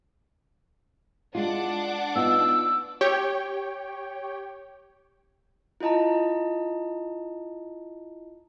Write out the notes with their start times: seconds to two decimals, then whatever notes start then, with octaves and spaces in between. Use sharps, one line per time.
1.35 G#3 D4 F4 F#5 D6
2.15 B3 D#4 F4 E6
3.01 G4 C#5 G5
5.80 E4 F4 D#5 A5 A#5